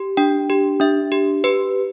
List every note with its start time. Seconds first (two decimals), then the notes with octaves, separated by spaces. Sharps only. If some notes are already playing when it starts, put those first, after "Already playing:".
Already playing: G4
0.17 D4 G5
0.49 G4
0.80 D4 E5
1.12 G4
1.44 G4 B4